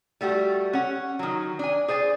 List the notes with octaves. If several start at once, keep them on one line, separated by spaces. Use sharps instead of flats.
G3 A3 F#4 G4
C#4 F#5
D#3 F#3
D4 G#5
G#4 C5 D5 G#5